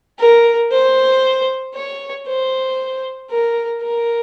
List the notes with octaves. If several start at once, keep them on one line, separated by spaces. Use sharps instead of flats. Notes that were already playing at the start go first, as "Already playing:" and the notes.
A#4
C5
C#5
C5
A#4
A#4